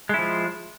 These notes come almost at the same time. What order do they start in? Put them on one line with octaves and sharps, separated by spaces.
G#3 E4 F3